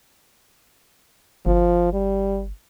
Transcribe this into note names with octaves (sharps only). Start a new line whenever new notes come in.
G1 F3
G3